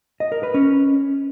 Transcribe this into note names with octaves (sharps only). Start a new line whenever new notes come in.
D#5
A#4
B4
C#4